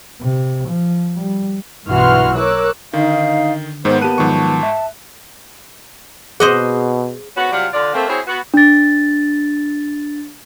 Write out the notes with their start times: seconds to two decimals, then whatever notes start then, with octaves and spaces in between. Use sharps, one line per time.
0.21 C3
0.67 F3
1.16 G3
1.87 B1 G2 E3 F#4 C6 F6
2.35 A#4 C#5 D6 E6 F#6
2.93 D3 D#3 D#4 F5
3.85 G#2 D#3 B3 C5
4.01 A#3 G4 A5 F#6 D#7
4.18 G#2 D#3 F3 F#3 C#6
4.63 E5
6.40 B2 G#4 C5 D#5 F#5
7.37 G#2 B3 C#4 F#4
7.52 C3 F#3 G3 F4 G4 F#5
7.74 D3 F4 D5
7.94 A3 A#3 C4
8.08 C4 E4 F#4 G#4 C5 C#5
8.27 B3 F#4
8.54 D4 A6